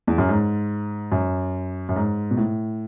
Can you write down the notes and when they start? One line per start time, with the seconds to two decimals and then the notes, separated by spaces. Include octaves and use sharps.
0.07 E2
0.18 F#2
0.29 G#2
1.12 F#2
1.89 F#2
1.96 G#2
2.31 B2
2.37 A2